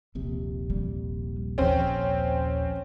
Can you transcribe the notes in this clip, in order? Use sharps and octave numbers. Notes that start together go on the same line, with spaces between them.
D#1 A#1 C3
G3
D#2 F3 C4 C#4